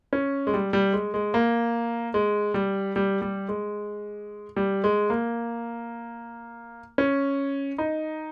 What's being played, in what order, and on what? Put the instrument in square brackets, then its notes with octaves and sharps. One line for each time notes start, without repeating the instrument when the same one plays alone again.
[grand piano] C#4
G#3
G3
G3
G#3
G#3
A#3
G#3
G3
G3
G3
G#3
G3
G#3
A#3
C#4
D#4